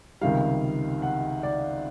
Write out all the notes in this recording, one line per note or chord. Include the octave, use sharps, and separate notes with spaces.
C#2 C3 D#3 G3 F5
F#5
D5